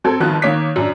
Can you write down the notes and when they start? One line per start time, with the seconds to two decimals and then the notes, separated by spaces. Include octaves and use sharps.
0.04 F#3 C4 A4 G#6
0.20 G1 D#3 F3 F#4 A5 F#6
0.42 D#3 A#3 C#5 D6 B6
0.76 F#2 D4